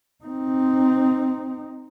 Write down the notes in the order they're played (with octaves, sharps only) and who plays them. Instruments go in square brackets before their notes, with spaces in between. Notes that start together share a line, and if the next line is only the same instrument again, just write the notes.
[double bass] C4 D#4